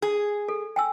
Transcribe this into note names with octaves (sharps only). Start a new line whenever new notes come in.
G#4
A4
G5 G#5 E6